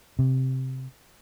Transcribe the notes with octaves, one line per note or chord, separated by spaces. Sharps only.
C3